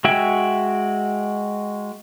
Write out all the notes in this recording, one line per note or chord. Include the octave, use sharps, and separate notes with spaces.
G#3 F#4 E5 G5 G#5